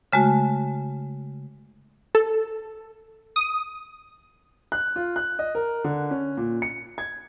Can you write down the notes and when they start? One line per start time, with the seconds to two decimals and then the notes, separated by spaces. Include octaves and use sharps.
0.13 C#3 G#3 A3 F#4
2.15 A4
3.36 D#6
4.72 F#6
4.96 F4
5.16 F#6
5.39 D#5
5.55 A#4
5.84 D3
6.11 C#4
6.37 A#2
6.62 C#7
6.98 G#6